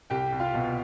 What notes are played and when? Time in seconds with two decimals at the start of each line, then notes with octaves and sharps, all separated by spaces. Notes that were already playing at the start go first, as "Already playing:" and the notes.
0.10 C2 G4 G5
0.32 C2
0.40 F4 F5
0.54 B2